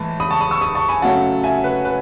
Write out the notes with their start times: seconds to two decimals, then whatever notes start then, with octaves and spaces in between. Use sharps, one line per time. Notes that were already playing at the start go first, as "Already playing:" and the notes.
Already playing: A2 E3 G#3 A5
0.20 B5 D#6
0.31 A5 C#6
0.41 B5 D#6
0.51 C#6 E6
0.61 B5 D#6
0.75 A5 C#6
0.89 G#5 B5
1.02 C#3 F#3 A3 C#4 F#5 A5
1.44 E5 G#5
1.64 B4
1.85 B4